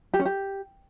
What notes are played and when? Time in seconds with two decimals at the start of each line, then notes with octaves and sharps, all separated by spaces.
0.14 G4
0.19 C#4
0.25 G4